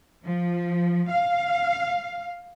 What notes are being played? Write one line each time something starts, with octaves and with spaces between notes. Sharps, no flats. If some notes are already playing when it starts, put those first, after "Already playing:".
F3
F5